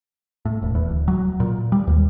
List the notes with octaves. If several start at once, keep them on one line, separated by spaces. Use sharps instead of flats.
A2
E1
E2
D1
F#3
A#2
G3
D#2